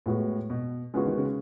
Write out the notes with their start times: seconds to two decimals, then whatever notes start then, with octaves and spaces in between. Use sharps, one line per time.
0.06 A2 G#3 B3 F#4
0.50 B2
0.94 C#3 G#3 B3 F#4
1.06 D#3
1.17 C#3